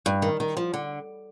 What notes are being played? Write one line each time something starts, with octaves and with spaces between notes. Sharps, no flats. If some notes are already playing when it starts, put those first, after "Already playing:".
G2
D#3
D#3
F3
D3